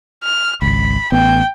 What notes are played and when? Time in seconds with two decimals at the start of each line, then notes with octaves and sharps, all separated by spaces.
0.24 F6
0.62 G#1 C#2 B5
1.12 A1 B3 G5